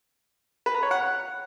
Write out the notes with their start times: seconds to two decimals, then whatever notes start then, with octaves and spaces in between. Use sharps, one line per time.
0.66 B4
0.74 A#5
0.83 C#5
0.91 F#5